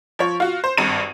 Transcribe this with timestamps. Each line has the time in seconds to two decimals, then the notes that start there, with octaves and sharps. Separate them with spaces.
0.19 F3 C#5
0.40 F4 F#4
0.64 C5
0.78 G#1 G2 D#7